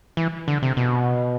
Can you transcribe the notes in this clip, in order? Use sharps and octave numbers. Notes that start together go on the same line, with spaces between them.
E3
D3
C3
B2